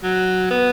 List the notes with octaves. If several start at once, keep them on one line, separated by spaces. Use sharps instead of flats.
F#3
B3